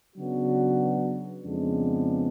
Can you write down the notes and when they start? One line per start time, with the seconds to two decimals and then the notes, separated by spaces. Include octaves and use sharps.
0.17 C#3 F#3 B3 D4 F#4
1.43 F2 C#3 G#3 B3 D4